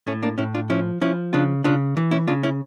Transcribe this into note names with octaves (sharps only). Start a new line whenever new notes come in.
A2 A3 C#4
A#3 D4
A2 C#4 E4
D4 F4
F3 C#4 E4
F3 C#4 E4
C#3 D4 F4
C#3 D4 F4
E3
C#4 E4
C#3 D4 F4
C#4 E4